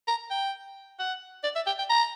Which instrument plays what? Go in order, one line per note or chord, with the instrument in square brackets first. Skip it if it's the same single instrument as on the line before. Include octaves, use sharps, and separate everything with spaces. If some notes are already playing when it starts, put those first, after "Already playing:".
[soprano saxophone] A#5
G5
F#5
D5
E5
G5
G5
A#5